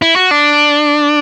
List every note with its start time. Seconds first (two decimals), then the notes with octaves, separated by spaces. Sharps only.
0.02 E4
0.16 F#4
0.31 D4